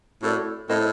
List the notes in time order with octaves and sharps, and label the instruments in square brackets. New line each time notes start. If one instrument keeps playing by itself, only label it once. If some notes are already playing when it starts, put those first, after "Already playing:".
[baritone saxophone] A2 [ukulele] F#4 A4 D5
[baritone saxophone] A2 [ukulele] E4 A4 C5 D#5